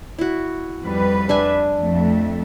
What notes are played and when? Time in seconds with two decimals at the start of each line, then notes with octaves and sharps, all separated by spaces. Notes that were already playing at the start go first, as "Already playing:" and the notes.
0.19 E4 F#4
0.83 F2 G3 B4
1.29 D4 E5 G#5
1.77 F2 A3